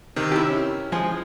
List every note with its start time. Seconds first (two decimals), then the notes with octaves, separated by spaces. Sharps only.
0.16 C3 D#3
0.32 E4 G4
0.47 C#4
0.92 F3 G#3 G#4